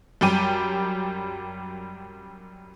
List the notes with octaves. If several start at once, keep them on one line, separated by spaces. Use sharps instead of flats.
F#2 G3 G4 D#7